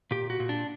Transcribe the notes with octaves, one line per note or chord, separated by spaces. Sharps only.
A#2 G4
F#4
A#2
D4